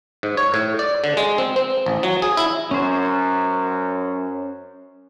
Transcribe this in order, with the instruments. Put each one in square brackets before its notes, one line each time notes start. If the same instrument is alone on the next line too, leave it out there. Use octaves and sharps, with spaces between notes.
[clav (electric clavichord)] G#2
C#5
A2
D5
D3
G#3
C4
C4
A1
F#3
G#4
E4
[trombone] F#2 [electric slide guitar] C#4 C5